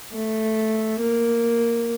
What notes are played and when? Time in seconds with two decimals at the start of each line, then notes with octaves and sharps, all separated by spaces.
0.13 A3
1.00 A#3